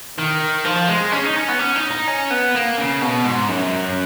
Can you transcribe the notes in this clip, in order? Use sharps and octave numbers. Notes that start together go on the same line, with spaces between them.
D#3
F3
G#3
C#4
D#4
C#4
B3
C#4
D#4
D#4
C#4
B3
A#3
C#3
B2
G#2
F#2